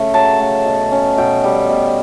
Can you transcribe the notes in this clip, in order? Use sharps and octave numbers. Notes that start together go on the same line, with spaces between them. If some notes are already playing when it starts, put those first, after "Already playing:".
Already playing: C#3 A3
F#3 A5
A3
B2
C#4
B2 G5
G3
B2